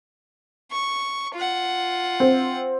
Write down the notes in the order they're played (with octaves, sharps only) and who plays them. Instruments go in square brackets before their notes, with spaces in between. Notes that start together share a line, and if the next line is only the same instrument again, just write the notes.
[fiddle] C#6
F4 F#5
[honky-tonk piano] C4